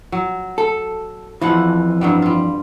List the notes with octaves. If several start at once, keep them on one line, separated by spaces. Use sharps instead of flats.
F#3
A4
F2 E3 F3 F#5
G2 F#3 G3
G3 F4